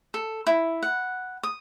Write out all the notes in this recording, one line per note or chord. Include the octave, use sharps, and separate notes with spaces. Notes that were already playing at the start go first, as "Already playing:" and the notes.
A4
E4
F#5
D#6